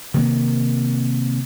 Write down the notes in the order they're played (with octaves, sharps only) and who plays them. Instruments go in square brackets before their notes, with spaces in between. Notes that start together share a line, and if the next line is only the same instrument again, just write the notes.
[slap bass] C3 D#3 A#3